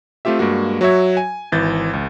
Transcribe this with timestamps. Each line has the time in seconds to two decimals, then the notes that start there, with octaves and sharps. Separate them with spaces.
0.25 A3 C4 F4 G4 E5
0.39 G2 G#3 A#3 F#4
0.81 F#3 F#4 C#5 E5 G#6
1.17 G#5
1.52 G#1 E3 G6 A6
1.93 C#2